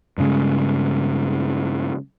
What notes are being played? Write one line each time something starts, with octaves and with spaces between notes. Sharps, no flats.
G2 C#3 G#3